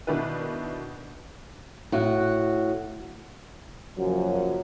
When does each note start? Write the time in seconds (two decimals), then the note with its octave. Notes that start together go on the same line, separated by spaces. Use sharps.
0.07 B2 D#3 B3 D4 E4 B4
1.92 A2 F#4
3.98 F#2 A#2 C#3 F3 F#3